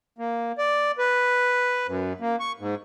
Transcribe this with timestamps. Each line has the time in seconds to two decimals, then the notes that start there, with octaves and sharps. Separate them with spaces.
0.18 A#3
0.58 D5
0.98 B4
1.87 F#2
2.20 A#3
2.40 C#6
2.60 G#2